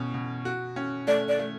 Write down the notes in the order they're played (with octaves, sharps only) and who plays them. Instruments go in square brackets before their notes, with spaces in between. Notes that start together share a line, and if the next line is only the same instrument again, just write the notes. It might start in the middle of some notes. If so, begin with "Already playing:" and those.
Already playing: [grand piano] B2 C#4
B2
F#4
C#4
[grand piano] A3 [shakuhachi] D5
[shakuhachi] D5
[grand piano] A3